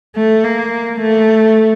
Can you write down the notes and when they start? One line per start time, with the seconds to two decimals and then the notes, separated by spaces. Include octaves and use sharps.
0.16 A3
0.44 A#3
1.01 A3